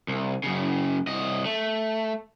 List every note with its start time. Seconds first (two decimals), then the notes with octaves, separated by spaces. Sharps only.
0.08 C2
0.44 F#2 C#3
1.07 C2 D#5
1.45 A3